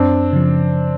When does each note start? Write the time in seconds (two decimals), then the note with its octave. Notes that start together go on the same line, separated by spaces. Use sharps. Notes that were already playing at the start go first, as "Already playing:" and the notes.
Already playing: F#2 C4 D4
0.33 C#3 F3